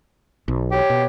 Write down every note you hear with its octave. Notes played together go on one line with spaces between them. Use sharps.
B1
G4 C#5
B2